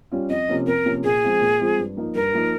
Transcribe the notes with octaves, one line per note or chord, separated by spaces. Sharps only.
G3 C#4 F4
F2 D#5
C3 F3 A#3 C#4
F2 A#4
C3 F3 A#3 C#4
A#2 G#4
F3 G#3 C4 F4
A#2
F3 G#3 C4 F4
G2
F3 A#3 D#4
G2 A#4
F3 A#3 D#4